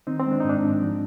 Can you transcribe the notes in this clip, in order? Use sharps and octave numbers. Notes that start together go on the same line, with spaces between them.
D#3 C4 D#4
C4
G#3
D4
D#4
G#2
D4
G#2
F3